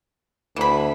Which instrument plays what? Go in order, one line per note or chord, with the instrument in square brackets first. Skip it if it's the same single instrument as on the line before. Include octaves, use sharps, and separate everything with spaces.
[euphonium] D2 [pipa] E3 B5